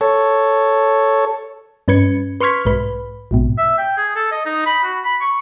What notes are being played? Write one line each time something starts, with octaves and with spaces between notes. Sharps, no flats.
A4 C#5
G2 C#4 B4 G#6 C#7
B4 C6 C#6 F6 G#6 B6
B1 G#2 B4 B5
A#1 G#2 B2
E5
G5
G#4
A4
D#5
D#4
B5
F#4
B5
C#6